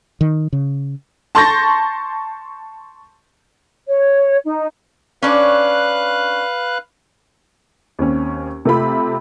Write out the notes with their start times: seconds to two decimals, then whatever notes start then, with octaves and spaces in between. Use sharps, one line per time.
0.21 D#3
0.53 C#3
1.35 A5 C6 C#6 G6 A6 A#6
3.88 C#5
4.45 D#4
5.22 C#4 D4 B4 C#5 F5 F#6
7.99 D#2 C4 C#4
8.65 C3 A3 F4 B5